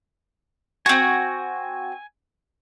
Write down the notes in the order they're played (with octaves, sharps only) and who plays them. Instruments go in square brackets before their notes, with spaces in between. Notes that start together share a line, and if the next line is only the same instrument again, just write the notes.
[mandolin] C4 F#4 [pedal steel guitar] G#5